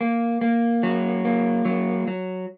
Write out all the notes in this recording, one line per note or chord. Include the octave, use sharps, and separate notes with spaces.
A#3
A#3
F#3
A#3
F#3
F#3